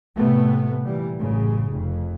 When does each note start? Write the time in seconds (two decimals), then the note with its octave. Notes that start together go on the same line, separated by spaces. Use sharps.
0.18 A2 C3 A3 B3
0.84 A#2 E3 G3
1.18 A1 F#2 C#3
1.71 F1 F2